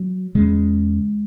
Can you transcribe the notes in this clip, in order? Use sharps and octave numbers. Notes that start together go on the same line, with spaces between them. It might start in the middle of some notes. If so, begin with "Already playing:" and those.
Already playing: F#3
E2 C#3 G#3